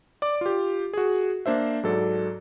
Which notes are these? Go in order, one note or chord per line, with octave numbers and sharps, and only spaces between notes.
D5 D6
F4 G4
F#4 G#4
A#3 D4 C5 E5
G#2 F#3 A4 D5